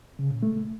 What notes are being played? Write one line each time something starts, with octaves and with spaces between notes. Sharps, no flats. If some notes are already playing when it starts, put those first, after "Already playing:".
C#3
A#2
A3